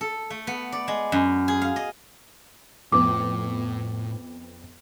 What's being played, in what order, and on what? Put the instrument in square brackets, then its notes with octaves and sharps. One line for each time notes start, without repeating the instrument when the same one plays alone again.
[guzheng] A4
A3
B3
D5
G#3
F#2
G#4
F5
D#5
[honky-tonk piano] F2 B3 [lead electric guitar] A2 [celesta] D6